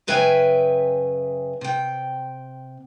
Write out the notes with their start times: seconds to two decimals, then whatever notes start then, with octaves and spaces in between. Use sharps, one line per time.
0.07 F#2 C#3 B4 E5 G5 G#5
1.61 C3 G5